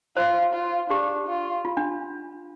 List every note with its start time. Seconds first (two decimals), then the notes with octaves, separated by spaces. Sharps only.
0.17 F4 C5
0.54 F4
0.90 D4 G4
1.28 F4
1.65 F4
1.77 D4